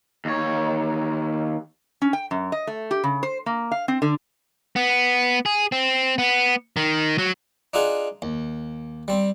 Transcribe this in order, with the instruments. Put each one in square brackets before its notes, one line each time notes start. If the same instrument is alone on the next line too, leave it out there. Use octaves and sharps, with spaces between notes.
[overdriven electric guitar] D#2 C#5
[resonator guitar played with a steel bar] C#4
G5
F#2
D#5
A3
G4
C#3
C5
A#3
F5
C4
D3
[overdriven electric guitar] B3
G#4
C4
B3
D#3
F#3
[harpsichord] D4 D#4 F4 G#4 F#5
D#2
G3 C4